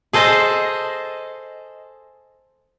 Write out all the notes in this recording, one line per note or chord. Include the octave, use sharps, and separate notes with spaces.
G#4 A4 C5 D#5